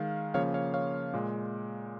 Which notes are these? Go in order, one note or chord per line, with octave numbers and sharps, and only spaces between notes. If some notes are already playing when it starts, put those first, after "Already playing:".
Already playing: D#3 G#3 F5
C#3 F3 A#3 C#5 F5
C#5 F5
C#5 F5
A#2 G#3